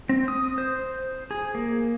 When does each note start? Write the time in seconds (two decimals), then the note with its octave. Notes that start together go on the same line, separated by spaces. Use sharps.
0.09 C4
0.28 D#6
0.58 C5
1.31 G#4
1.55 A#3